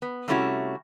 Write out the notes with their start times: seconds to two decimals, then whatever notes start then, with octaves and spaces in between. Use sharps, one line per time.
0.02 B3
0.28 C3 G3 A3 C#4 E4 F#4